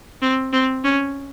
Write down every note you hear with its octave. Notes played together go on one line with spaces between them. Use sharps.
C4
C4
C#4